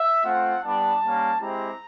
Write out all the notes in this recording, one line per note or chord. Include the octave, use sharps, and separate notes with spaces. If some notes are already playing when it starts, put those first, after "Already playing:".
Already playing: E5
A3 C4 F4 F#5
G3 B3 D4 A5
G3 A#3 C#4
G#3 C4 E4 G4 A#5